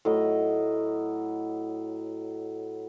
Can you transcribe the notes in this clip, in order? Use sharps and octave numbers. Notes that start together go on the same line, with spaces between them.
A2 F#3 D#5